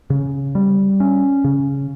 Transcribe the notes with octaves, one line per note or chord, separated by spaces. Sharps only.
C#3
G3
C#4
C#3